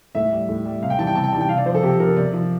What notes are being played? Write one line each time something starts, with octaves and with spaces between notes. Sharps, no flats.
A2 E5
G3
A2
G3
C3 F5
G5
E3 G3 A5
G5
C3 A5
G5
E3 G3 G5 A5
C3 F5
D5
F3 C5
A4
C3 G4
F3 A#4
C3 D5
F3